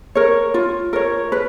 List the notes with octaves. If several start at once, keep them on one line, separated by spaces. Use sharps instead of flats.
A#4 C#5
F4
A#4 C#5
B4